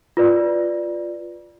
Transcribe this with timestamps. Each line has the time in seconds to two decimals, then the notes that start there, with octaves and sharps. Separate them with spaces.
0.17 F4 B4 D5